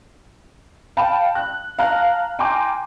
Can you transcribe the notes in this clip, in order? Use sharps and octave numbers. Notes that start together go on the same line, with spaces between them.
F5 G5 A5 B5
F#6
F5 A5 A#5 F6 F#6
G5 G#5 A#5 C6 D6 G6